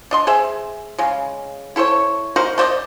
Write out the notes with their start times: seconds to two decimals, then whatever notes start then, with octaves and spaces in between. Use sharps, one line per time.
0.11 D4 D#5 C6
0.27 G#4 C5 E5
0.98 C#3 G#3
1.76 E4 A4 C5 C#5
2.36 D#4 F#4 A#4 C5
2.58 A3 C5 D5 D#5